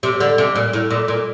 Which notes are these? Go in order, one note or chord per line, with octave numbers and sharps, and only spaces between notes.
C3
D3
C3
A#2
A2
A#2
A#2